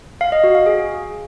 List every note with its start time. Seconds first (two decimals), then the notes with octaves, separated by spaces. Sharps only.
0.21 F5
0.32 D#5
0.44 F#4
0.55 F5
0.66 G#4